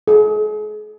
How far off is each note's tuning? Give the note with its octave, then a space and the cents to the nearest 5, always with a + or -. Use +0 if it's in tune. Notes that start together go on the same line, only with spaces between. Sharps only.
G#4 +40